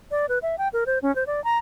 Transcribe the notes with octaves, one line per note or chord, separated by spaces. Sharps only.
D5
B4
E5
G5
A#4
C5
C#4
C5
D5
A#5